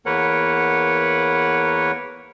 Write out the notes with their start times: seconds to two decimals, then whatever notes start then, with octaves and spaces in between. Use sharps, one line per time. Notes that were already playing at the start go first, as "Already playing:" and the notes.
0.06 E2 A#3 A#4 B4 C#5 F#5